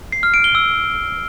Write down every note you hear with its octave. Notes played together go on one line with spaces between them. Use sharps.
C7
F6
D7
G7
E6